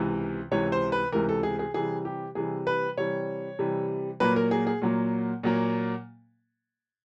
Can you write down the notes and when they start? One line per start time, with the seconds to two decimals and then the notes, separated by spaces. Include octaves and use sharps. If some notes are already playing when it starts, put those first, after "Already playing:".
Already playing: C#2 C3 E3
0.51 C#2 C3 E3 C#5
0.72 C5
0.92 B4
1.12 C#2 C3 E3 A#4
1.29 A4
1.43 G#4
1.59 G#4
1.74 C3 E3 G3 G#4
2.05 G4
2.35 C3 E3 G3 G#4
2.67 B4
2.97 C3 E3 G3 C#5
3.59 C3 E3 G3
4.20 A#2 F#3 A#3 B4
4.36 A#4
4.51 G#4
4.67 G#4
4.82 A#2 F#3 A#3
5.43 A#2 F#3 A#3